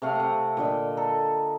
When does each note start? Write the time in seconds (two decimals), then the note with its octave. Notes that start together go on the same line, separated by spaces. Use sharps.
0.02 C3 A3 F5 F#5
0.15 C3 F#5
0.57 A#2 D3 D#5
0.97 A4 A#5